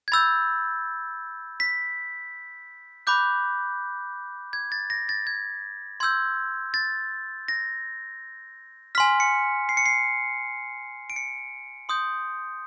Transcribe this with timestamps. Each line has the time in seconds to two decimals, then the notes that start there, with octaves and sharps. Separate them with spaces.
0.08 G#6
0.12 B5 E6 G6 A6
1.60 B6
3.07 B5 D6 F#6 G6
4.53 G#6
4.72 A6
4.90 A#6
5.09 A6
5.27 G#6
6.00 C6 E6 G6 G#6
6.74 A6
7.48 A#6
8.95 F6 B6
8.98 G#5 C6
9.20 C#7
9.69 C7
9.77 C#7
9.86 C7
11.10 D7
11.16 C#7
11.89 C6 D#6 G6